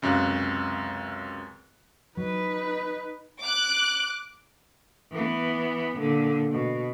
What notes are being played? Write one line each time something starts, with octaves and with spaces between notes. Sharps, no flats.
C#2 F#2 C3 F5 F#6
F#3 D#4 B4
D6 F#6
E3 B3
A#2 D3
B2